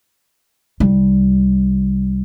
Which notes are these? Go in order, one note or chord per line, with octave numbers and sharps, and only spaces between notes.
C2 G3